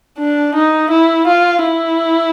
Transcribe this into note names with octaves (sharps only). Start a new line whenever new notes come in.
D4
D#4
E4
F4
E4